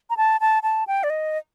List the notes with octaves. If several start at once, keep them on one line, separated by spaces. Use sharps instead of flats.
A#5
A5
A5
A5
G5
D5
D#5